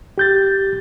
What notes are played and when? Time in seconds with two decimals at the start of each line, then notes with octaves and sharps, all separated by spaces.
0.18 G4 G6 A6